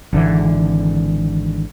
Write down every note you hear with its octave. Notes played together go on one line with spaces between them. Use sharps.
G#1 D3 E3